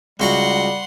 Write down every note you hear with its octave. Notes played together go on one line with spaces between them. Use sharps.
C#2 G3 F#4 F#5 A#5 C6